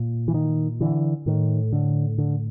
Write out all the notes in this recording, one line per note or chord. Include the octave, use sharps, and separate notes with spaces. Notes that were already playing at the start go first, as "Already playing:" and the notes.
Already playing: A#2
E3
D#3
D3 E3
A2 D#3
D3
D3